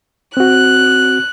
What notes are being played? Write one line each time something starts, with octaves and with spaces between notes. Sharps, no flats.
C4 F#4 F#6